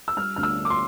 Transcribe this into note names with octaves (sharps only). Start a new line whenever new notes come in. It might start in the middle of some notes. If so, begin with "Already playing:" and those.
E6
G3 F6
D2 F6
E6
D4
D6
C6